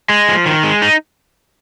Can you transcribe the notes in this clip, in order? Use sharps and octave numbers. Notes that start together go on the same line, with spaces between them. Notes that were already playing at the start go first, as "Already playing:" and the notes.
G#3
F3
D#3
G#3
D#4